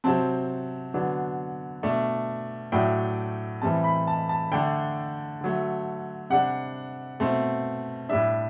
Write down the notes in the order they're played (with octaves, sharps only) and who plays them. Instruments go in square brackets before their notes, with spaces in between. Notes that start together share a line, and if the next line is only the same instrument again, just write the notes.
[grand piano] C3 F#3 C4 A5
D3 F#3 B3 D4
B2 A3 D4
A2 F#3 A3 D4 G5
A2 E3 G3 C4 A5
B5
A5
A5
D3 A3 D4 G5
D3 F#3 A3
C3 G3 D4 F#5
B2 A3 C4
A2 G3 D4 E5